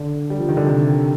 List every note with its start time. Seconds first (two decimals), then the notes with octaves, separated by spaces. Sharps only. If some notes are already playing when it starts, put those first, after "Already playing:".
Already playing: D3
0.30 G3
0.39 F3
0.49 D#3
0.57 D3
0.67 C3